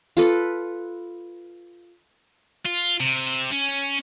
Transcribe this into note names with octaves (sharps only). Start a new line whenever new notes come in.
F4 A4 B4
F4
C3
C#4